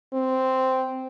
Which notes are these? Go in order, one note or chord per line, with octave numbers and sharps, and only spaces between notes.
C4